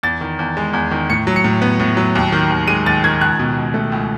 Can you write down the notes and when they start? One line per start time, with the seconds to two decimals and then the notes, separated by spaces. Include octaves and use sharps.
0.03 E2 A6
0.21 D#3
0.39 E2
0.57 G#3
0.73 E2
0.91 D#3
1.10 A2 C#7
1.27 F#3
1.36 C#7
1.44 A2
1.62 B3
1.80 A2
1.97 F#3
2.15 D#2
2.32 D#3
2.50 D#2
2.68 G#3 D#7
2.86 D#2 A6
3.04 D#3 G#6
3.21 C#2 F#6
3.39 B2
3.57 C#2
3.74 A3
3.92 C#2